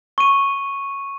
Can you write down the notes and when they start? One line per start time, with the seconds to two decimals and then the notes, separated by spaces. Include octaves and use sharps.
0.18 C#6 D#7